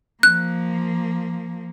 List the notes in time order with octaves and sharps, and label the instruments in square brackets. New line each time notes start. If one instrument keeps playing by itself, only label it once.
[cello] F3 A#3 [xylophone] F#6